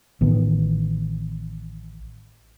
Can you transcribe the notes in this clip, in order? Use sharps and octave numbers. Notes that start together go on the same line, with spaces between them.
A1 D#3 B3